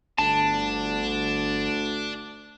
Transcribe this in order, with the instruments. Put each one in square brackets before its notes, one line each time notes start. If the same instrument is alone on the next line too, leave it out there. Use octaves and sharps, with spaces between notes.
[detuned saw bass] G1 [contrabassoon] D2 [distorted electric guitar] D4 [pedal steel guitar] A5